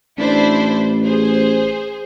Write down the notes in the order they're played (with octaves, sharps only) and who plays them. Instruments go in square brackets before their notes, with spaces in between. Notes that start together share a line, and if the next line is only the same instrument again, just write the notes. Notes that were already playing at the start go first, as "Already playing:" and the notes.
[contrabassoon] A1 [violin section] D4 E4 C5
[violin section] G#4 C5